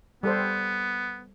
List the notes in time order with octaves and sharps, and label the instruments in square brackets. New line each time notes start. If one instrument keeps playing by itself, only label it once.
[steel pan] G3 A4 C5 [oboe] B3